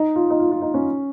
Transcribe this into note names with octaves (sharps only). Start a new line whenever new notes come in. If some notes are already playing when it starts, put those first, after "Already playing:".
Already playing: D#4
F4
D#4
F4
F4
D#4
C#4